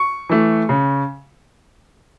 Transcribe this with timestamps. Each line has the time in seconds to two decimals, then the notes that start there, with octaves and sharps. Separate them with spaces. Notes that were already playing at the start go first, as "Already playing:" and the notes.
Already playing: C#6
0.29 E3 A3
0.69 C#3